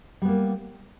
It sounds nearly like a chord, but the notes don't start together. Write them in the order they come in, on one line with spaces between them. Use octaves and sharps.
G3 B3 A#3